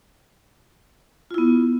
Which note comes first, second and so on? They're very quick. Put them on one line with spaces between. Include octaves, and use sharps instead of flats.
F4 E4 B3